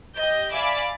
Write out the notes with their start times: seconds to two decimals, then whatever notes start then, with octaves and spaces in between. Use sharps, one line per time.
0.17 G4 D#5 G6
0.52 D5 E5 F5 G#5 B5 D6